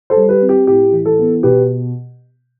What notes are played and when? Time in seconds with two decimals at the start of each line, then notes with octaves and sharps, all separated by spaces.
0.10 A4 C5
0.16 G3
0.29 G4 B4
0.42 C4
0.49 G4
0.67 A2 G4
0.92 E3
1.05 A4
1.19 B3
1.43 B2 G4 B4